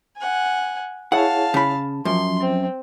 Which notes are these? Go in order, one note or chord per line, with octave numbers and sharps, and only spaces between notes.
F#5 G#5
E4 G#4 C#5 F5 F#5 A5
C#3 B5
F#2 F3 C6
C4